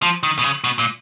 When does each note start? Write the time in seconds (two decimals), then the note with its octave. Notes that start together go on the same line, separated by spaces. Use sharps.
0.03 F3
0.23 D#3
0.39 B2
0.43 C#3
0.64 B2
0.79 A#2